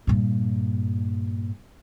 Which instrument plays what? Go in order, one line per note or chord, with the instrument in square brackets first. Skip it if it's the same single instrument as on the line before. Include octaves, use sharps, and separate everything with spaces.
[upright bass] G2 A#2